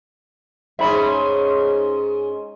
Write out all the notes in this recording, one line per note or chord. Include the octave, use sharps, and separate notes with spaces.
G#2 C#4 E5 B5